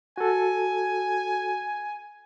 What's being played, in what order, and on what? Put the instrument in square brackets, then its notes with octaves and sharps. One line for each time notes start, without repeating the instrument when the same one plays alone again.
[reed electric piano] F#4 A4 [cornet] G#5